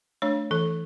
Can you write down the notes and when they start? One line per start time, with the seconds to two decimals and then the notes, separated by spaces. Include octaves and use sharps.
0.22 A3 D4 C#5
0.51 E3 A4